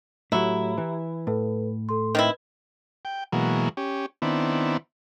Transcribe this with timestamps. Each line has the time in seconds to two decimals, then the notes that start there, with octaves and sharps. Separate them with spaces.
0.32 A2 F#3 E4 G4 A#5
0.78 E3
1.27 A2 A4 B4
1.89 A4 C6
2.15 D#3 C4 E4 B4
3.05 G5
3.32 B2 E3 F#3 G#3 A#3
3.77 C#4 G4
4.22 D#3 B3 C4 D4 E4